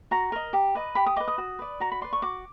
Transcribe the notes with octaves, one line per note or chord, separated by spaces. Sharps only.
F#4 A#5
A#4 D#5
G4
B4 D#5
G4 B5
D#6
B4 D#5 D6
D#6
F#4
B4 D5
F#4 A#5
B5
B4 D5 C6
C#6
F#4 D6